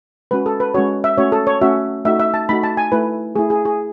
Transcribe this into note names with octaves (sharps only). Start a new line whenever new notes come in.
G#3 C#4 F#4 B4
A4
B4
G#3 C#4 F#4 C#5
E5
A3 C#4 F#4 C#5
A4
C#5
A3 C#4 F#4 E5
A3 D#4 F#4 E5
E5
A5
A3 D#4 F#4 B5
A5
G#5
A3 E4 B4
A3 E4 G#4
G#4
G#4